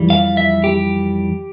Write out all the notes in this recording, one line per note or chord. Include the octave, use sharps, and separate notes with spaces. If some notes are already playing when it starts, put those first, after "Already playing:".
Already playing: F2 E3 G3
F5
E5
G4